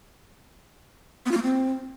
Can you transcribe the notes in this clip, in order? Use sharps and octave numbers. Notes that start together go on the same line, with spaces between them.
B3
F4
A#3
C4